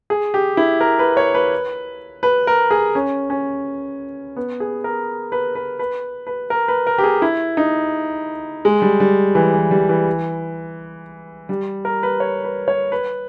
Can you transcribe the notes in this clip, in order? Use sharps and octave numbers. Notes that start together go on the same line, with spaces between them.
G#4
G4
E4
A#4
B4
C#5
B4
B4
A#4
G#4
C#4
C#4
B3
G#4
A#4
B4
B4
B4
B4
A#4
B4
A#4
G4
G#4
E4
D#4
G#3
G3
G3
E3
E3
G3
E3
G3
A#4
B4
C#5
B4
C#5
B4